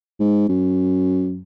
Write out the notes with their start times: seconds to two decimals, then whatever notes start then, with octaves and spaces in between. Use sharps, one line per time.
0.19 G#2
0.49 F#2